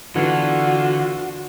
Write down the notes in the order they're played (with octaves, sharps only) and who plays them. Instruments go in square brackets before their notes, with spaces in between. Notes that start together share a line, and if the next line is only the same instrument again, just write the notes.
[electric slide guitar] D3 [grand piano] E3 B3 [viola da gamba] D4 F4 [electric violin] F#4